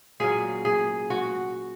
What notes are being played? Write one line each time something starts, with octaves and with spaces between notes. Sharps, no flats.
A#2 F#3 C#4 G#4
G#4
F#4